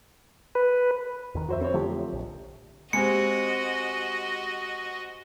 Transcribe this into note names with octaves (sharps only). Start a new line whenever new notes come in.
B4
E2 D#3
F2 F#4 C5 E5
C4 C5 C#5
D3 F3 F#3 A3 G4
A#1
G#3 C4 F#4 G4 D#5 C#7